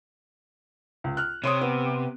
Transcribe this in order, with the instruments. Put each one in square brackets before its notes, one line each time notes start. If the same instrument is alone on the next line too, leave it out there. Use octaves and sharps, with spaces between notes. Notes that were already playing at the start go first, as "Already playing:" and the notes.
[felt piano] C#2
F6 F#6
[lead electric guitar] C3 [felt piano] C#5 C6 D#6
[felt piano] B3